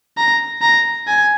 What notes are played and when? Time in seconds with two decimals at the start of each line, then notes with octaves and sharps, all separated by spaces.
0.17 A#5
0.62 A#5
1.07 G#5